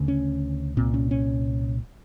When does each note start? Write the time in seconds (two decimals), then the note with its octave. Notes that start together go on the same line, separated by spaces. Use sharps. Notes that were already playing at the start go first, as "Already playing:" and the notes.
Already playing: D2 C#3
0.08 C#4
0.77 C2 A#2 C4
0.94 C#4
1.11 C#4